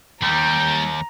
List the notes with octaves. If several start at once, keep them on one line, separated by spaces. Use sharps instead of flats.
D#2 G3 G5 A#5